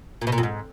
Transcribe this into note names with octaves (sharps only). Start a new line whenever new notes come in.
A#2
B2
A#2
F2
G#2